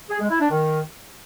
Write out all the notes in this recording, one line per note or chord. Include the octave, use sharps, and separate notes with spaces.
G#4
G#3
E4
D4
D#3